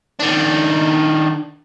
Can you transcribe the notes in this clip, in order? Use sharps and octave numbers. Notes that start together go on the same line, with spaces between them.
D#3 D4